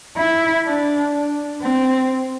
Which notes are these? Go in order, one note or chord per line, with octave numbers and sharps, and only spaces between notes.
E4
D4
D4
C4